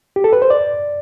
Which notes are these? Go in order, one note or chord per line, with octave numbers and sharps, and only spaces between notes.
G4
A4
B4
C5
D5